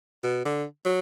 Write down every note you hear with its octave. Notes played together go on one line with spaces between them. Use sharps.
B2
D3
F#3